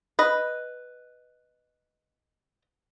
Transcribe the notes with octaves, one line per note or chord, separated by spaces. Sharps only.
B4 D#5